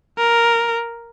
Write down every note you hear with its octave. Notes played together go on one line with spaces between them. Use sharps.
A#4